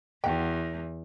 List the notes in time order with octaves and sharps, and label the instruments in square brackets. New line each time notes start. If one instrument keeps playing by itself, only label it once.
[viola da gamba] E2 [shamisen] F#4 F#5 G5